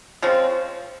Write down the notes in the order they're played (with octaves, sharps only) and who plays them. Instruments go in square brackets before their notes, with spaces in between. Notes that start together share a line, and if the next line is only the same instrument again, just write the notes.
[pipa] C#3 F3 G#3 C4